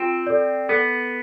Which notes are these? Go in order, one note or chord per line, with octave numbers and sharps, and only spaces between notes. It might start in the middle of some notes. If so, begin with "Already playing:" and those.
Already playing: C4 F4
A4 D5
B3 A4